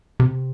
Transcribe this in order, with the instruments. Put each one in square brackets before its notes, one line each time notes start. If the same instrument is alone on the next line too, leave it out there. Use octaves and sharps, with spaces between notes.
[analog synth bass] C3